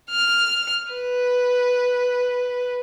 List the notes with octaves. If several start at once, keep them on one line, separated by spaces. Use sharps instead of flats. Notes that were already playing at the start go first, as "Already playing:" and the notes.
F6
B4